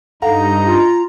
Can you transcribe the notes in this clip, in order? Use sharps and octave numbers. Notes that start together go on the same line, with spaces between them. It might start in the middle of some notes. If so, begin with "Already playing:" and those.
G2 D#4 A4 F5 F#5 A#5
F4